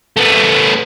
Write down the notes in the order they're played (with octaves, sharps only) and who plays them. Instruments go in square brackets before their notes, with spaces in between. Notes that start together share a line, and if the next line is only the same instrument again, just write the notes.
[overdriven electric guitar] A3 B3